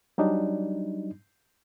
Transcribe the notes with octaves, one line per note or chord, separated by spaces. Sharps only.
F#3 G3 D4 D#4